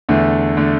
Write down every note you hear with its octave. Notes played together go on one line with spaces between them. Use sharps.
E2 D3 A3
D3 A3